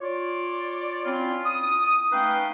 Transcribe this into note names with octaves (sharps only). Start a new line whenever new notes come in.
F4 C#5 D5
C4 C#4 E4 F4
D#6
A3 C#4 D#4 B4 F5 G5